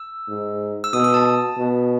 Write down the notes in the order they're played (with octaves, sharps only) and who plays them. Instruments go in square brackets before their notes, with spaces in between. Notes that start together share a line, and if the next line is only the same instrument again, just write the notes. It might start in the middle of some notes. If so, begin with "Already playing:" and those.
Already playing: [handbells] E6
[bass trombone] G#2
[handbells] E6
[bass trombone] B2 [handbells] D#6
[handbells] D#6
A5
[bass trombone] B2